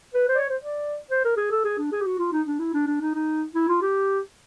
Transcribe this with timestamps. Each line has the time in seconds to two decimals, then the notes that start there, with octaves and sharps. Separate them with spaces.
0.14 B4
0.29 C5
0.35 D5
0.38 C#5
0.49 C5
0.60 D5
1.11 C5
1.24 A#4
1.37 G#4
1.51 A4
1.64 G#4
1.78 D4
1.92 G#4
2.01 G4
2.06 F#4
2.18 F4
2.32 D#4
2.47 D4
2.60 E4
2.74 D4
2.87 D4
3.01 D#4
3.14 D#4
3.55 E4
3.68 F4
3.82 G4